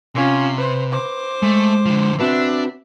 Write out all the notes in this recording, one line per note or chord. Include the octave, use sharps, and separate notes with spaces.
C3 C#4 F4
B4 C5
C5 D6
G#3 A3
D3 F3
C4 D4 F#4 B4 E5